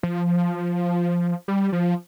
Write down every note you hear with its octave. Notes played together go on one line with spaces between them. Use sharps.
F3
G3
F3